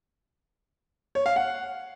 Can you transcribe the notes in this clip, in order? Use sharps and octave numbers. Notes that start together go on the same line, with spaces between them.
C#5
F5
F#5